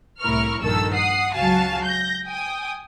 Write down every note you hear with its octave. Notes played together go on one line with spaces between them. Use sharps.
C2 A2 E4 A#4 C#6 F6
A#1 G2 D#3 A4 E6
F#5 D#6 C7
C#2 F#3 F#4 F5 G#5 A5
G6 A#6
G5 G#5 D#6